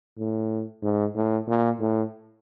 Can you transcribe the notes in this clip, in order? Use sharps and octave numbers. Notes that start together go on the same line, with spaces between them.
A2
G#2
A2
A#2
A2